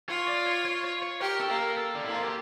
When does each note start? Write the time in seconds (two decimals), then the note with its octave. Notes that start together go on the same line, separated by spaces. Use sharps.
0.09 F4 C#5
0.28 D5
0.47 C#5
0.65 C#5
0.85 C#5
1.02 C#5
1.21 G4 A#4
1.41 A4
1.50 A#3
1.59 A#4
1.77 A4
1.95 D4
2.04 A#3 E4
2.14 F4
2.24 G4